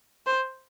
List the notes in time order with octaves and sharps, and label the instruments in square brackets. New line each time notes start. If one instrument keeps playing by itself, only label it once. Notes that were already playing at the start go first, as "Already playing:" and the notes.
[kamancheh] C5